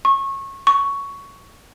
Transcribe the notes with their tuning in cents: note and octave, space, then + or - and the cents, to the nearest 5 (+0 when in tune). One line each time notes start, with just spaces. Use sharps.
C#6 -25
C#6 +10